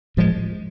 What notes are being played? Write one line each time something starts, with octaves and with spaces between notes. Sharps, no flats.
A2 F3 G#3